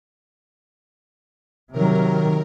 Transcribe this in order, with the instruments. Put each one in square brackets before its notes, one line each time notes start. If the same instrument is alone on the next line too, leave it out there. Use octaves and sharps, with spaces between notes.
[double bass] C3 F#3 [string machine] D#3 A#4